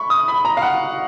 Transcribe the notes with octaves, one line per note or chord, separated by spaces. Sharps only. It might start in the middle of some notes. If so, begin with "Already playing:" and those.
Already playing: B5 C#6
D#6
B5
A#5
F5
F#5